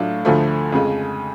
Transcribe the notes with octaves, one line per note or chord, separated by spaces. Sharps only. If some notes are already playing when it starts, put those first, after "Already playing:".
Already playing: A2 F#3 A3 D4 F4
D2 D3 F3 A3
F2 C#3 G#3